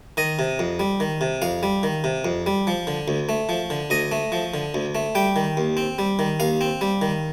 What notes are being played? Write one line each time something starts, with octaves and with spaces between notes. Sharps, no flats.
D#3 D#5
C3
F2
G3
D#3
C3
F2 F5
G3
D#3
C3
F2
G3
F3
D3
D2
A3
F3
D3
D2 D#5
A3
F3
D3
D2
A3
G3 G5
D#3
D#2
C4
G3
D#3
D#2 F5
C4
G3
D#3